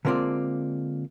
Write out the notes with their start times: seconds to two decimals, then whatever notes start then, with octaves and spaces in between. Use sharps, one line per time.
0.05 D3 G#3 A#3 C4 F4 D5